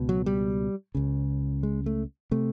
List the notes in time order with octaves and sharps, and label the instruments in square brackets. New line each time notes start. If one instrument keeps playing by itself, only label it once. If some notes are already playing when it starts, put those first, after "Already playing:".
Already playing: [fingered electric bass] C#2 B2
F#3
G3
C#2 C#3
G#3
A3
C3 A3